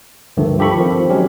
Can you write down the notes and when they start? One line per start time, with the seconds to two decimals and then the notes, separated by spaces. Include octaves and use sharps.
0.37 C#2 G2 D3 D#3 F3 A3
0.59 F4 G4 A4 B5 C#6
0.76 D#3 F3 C4
1.10 F#3 G#3 C#4 G4